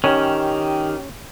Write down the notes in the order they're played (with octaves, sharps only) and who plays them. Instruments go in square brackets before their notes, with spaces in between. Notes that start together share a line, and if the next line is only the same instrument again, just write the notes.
[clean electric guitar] D#3 [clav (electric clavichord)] C#4 [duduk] G4